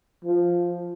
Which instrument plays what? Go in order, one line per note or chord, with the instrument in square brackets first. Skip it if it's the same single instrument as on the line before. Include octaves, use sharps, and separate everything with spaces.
[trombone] F3